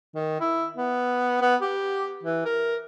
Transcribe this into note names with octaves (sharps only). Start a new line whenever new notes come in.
D#3
E4
B3
B3
G4
E3
A#4